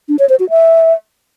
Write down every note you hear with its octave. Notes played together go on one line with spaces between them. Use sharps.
D4
C#5
C5
F#4
E5